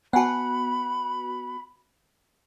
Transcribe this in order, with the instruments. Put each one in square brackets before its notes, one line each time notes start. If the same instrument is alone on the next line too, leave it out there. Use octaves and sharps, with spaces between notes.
[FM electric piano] B3 F#4 [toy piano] F#5 G#5 A5 [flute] B5